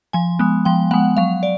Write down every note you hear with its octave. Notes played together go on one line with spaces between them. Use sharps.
F3 G#5
G#3 B3
F3 G5
G#3 B3 F#5
F#3 F5
D5